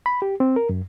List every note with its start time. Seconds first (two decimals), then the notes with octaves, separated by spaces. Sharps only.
0.06 B5
0.22 G4
0.40 C4
0.56 A#4
0.69 F#2